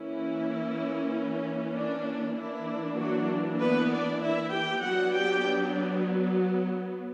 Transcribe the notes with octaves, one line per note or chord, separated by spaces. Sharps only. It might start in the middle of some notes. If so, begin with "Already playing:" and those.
Already playing: E3 A#3 C#4 E4
D4
E3 A#3 D4 E4
F#3 F#4
B3 B4
D4 D5
E4 E5
G4 G5
F#3 B3 D4 F#4 F#5
G4 G5